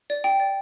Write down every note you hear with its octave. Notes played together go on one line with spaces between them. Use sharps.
D5
G5
D5